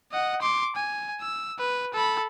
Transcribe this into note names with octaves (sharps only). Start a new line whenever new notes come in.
D#5 F#5
C6 D6
G#5
E6
B4
A4 B5